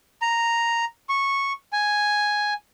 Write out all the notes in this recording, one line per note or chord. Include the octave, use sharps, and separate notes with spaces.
A#5
C#6
G#5